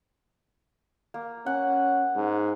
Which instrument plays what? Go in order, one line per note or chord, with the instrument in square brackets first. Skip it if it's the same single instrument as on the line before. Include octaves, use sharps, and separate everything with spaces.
[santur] A#3
[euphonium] C#4 [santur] F#5
[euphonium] G#2